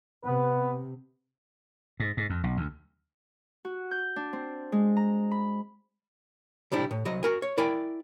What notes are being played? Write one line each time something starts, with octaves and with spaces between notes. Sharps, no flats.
C3 B3 B4
G#2
G#2
F2
B1
D2
F#4
G6
D4
C4
G#3
A#5
B5
A2 C3 G3 D4 E4
A2
C2 F#3 D#5
F#4 A#4 G#5
C#5
E4 A#4 D5 G5 G#5